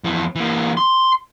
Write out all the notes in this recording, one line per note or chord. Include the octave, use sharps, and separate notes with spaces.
F2 E3
E3 A#3
C6